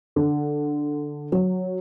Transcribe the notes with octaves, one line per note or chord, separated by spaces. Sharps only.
D3
F#3